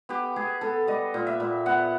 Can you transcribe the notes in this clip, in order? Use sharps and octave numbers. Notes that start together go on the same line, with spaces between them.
B3 G4
B3 G#4
B3 A4
G3 D#5
A#2
E5
A#2
B3 F#5